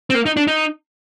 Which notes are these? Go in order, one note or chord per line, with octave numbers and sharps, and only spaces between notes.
C4
A#3
D#4
D4
D#4